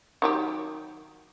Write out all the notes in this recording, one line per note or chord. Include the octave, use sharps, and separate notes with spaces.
D#3 F#3 G4